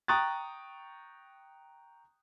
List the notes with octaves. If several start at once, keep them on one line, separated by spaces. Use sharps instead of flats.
G5 A#5 C#6 D#6 F#6 A6